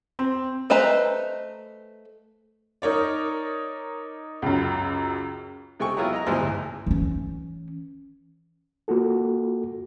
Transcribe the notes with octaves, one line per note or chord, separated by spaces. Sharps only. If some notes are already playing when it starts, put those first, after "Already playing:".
C4
A3 B4 C5 D#5 A#5
D#4 A#4 C#5 D5
C#2 F#2
C3 A3 G5 G#5 C#6
F#3 G#3 B3 E4 F4
D#5 A#5
D2 G#2 E3 F3 G3
A1
E3 C#4
A#3 F4 F#4 A4